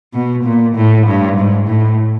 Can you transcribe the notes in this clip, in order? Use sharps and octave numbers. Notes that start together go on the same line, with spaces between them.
B2
A#2
A2
G2
G#2
A2